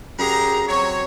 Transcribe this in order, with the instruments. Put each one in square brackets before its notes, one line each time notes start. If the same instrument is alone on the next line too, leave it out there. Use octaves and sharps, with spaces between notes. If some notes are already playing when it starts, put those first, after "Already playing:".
[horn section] F#2 G4 G#4 A#5
F#3 C4 C#5